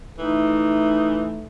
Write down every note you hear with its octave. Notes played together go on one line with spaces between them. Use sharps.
E3 A3 D#4